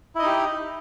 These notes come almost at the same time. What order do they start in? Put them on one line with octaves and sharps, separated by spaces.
E4 D#5 D#4 G4